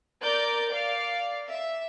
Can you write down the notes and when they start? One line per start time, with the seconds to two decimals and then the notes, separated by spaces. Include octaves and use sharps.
0.23 A#4 D5 G6
0.70 D5 F5
1.49 E5